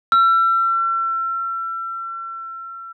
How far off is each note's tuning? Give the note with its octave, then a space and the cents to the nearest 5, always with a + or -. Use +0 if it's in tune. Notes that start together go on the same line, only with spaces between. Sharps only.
E6 +40